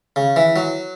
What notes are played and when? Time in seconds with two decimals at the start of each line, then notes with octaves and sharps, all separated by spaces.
0.16 C#3
0.36 E3
0.56 F#3